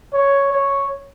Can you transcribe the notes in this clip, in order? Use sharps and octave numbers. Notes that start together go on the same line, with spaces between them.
C#5
C#5